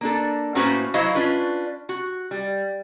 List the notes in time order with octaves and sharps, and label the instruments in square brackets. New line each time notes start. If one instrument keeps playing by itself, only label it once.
[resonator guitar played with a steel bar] A#3 D4 A4
A2 A#3 C#4 F#4 B4 C5
F#3 E4 F#4 C5 D#5 F5
C#4 D4 F4 B4
F#4
G3